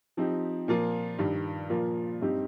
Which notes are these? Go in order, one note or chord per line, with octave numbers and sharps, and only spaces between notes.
F3 C4 D#4 G4
A#2 F3 A#3 F4
G2 D#3 G3
A#2 F3 A#3 F4
G2 G3 C4 D#4 G4